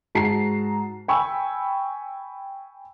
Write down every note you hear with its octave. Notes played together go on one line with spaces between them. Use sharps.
G#2 F#4 A5 A#5 C7
G5 G#5 B5 C#6 E6